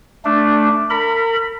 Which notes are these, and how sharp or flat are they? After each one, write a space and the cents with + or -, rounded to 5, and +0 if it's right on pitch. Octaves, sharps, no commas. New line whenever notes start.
A3 +0 D4 +0
A#4 -35 B5 +0